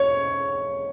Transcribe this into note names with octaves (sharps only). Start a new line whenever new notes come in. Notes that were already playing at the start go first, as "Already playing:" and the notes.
Already playing: C#5